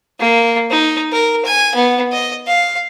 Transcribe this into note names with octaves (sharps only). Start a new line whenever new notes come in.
A#3
D#4
A#4
G#5
B3
D#5
F5